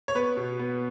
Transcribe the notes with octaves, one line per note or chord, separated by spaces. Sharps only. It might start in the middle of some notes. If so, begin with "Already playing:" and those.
C#5
B3 B4
B2
B3